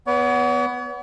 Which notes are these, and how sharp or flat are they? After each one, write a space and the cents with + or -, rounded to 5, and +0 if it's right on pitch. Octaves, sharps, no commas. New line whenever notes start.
B3 +0 C#5 +45